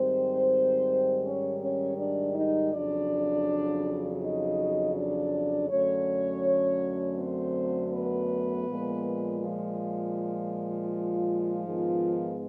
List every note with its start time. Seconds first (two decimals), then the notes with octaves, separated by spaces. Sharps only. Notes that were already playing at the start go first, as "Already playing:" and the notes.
Already playing: G#2 D#3 G3 C4 C5
1.23 C#4 C#5
1.60 C#4 C#5
1.98 D4 D5
2.34 D#4 D#5
2.72 F2 C#3 F#3 D4 D5
4.21 D#4 D#5
4.95 D4 D5
5.69 F#2 D3 F#3 A3 C#4 C#5
7.17 C4 C5
7.91 B3 B4
8.66 A#2 F3 G#3
9.40 F3 F4
11.63 G#2 D#3 G#3 B3